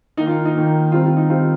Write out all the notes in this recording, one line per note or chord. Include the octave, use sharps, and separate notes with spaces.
D#3 A#3 D#4
F4
D#4
D#3 A#3
D#3 G3 C4 F4
F4
D#4
D#3 G3 C4 F4